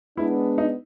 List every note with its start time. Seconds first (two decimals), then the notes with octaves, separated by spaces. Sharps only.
0.17 G#3 B3 D4 E4
0.58 D#4